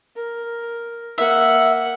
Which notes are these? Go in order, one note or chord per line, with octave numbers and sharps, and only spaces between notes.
A#4
A#3 E5 F#5